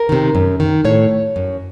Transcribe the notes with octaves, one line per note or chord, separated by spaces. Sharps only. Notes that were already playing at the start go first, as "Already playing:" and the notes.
Already playing: A#4
C3 D#3
F#2
D#3
A2 C#5
F#2